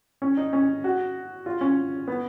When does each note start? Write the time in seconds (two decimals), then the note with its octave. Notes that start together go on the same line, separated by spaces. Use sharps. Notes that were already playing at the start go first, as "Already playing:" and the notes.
0.22 C#4
0.37 D#4
0.53 C#4
0.84 F#4
1.46 F4
1.61 C#4
2.08 B3